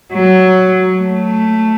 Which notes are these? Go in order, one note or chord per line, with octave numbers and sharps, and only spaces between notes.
F#3
A3